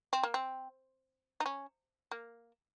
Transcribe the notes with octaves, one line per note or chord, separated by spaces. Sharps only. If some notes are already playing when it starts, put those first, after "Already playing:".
C4
A#3
C4
D#4
C#4
A#3